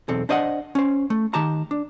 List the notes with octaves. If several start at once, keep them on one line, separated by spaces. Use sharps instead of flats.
B1 E2 C4 A4
D4 C5 D#5 E5 F#5
C#4 C5
A3
D#3 G4 A5 A#5
D4